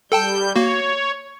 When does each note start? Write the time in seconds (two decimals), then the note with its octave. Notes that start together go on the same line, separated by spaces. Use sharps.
0.12 G3 A4 G5 A5 G6
0.56 A#3 F#4 C#5